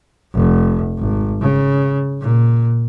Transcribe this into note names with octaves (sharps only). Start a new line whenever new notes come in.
F1
G#1
C#3
A#2